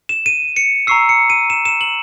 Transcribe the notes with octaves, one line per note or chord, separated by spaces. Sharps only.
E7
D#7
C#7
A#5 C#6 E6 C7
C#7
D#7
E7
E7
F#7